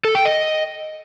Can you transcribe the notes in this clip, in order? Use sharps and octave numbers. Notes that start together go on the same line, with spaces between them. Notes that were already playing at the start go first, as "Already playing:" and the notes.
A4
G5
D#5